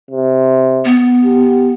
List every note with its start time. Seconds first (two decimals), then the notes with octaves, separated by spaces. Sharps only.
0.11 C3
0.85 B3
1.24 G4